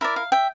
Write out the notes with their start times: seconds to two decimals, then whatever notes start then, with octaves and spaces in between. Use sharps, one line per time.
0.01 E4 A#4 D5 E5
0.16 F5
0.32 E5 G5